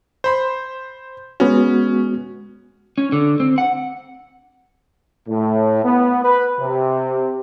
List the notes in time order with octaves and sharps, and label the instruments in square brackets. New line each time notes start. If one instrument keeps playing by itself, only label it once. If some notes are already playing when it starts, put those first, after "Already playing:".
[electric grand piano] C5 B5 C6
[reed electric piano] G#3 B3 F#4 [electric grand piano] C#4
[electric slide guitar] C#4
D3
C4
F#5
[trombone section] A2
B3
B4
C3